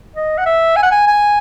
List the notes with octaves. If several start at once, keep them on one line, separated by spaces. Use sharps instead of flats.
D#5
F#5
E5
G#5
F#5
G#5
G#5